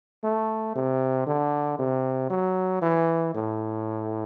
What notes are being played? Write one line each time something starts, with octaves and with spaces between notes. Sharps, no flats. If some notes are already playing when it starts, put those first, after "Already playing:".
A3
C3
D3
C3
F#3
E3
A2